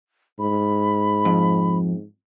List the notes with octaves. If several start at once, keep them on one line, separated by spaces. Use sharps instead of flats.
G#2 B5
F2